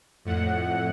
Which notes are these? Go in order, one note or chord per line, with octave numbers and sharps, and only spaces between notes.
F2 A2 F#5